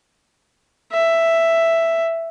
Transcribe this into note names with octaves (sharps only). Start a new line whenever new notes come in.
E5